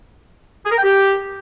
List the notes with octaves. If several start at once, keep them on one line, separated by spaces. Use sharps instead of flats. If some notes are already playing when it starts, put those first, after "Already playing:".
G#4
A#4
G5
G4